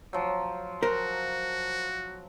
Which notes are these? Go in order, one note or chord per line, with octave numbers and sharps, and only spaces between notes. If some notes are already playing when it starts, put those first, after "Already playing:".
F3 F#3
F#4 A#4 C5